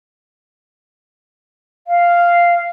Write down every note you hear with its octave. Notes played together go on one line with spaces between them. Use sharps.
F5